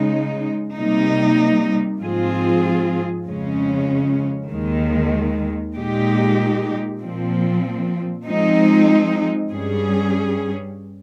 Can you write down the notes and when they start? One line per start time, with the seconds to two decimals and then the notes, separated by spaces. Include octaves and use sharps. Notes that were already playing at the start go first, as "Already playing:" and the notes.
Already playing: C#3 G#3 D#4
0.75 C3 G3 A#3 D#4
2.00 G#2 F3 C4 F4 G#4
3.25 F2 C#3 G#3 C#4
4.49 D#2 D#3 G#3
5.75 A#2 G#3 D#4 G4
7.00 A#2 F3 C4
8.25 F3 G#3 C4 D#4
9.50 G2 G3 C#4 G#4